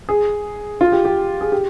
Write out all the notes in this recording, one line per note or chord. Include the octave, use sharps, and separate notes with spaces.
G#4
F4
G4
G4
G#4
G4